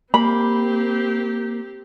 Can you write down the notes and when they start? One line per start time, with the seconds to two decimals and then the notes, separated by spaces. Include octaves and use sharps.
0.14 A#3 C4 G4 B5